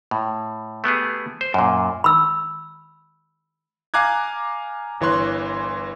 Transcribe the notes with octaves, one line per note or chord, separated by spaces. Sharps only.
A2
A3 B3 G4 G#4
C5
F#2 A#2
B5 E6
F5 G#5 A#5 D6 F#6 G#6
G1 E3 C#5 C6 F#6